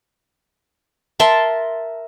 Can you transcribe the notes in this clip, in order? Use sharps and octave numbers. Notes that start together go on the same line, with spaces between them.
A#4 E5 A5 C6